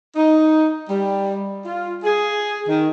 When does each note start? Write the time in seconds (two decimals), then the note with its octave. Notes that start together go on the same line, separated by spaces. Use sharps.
0.16 D#4
0.89 G3
1.65 F4
2.03 G#4
2.67 D#3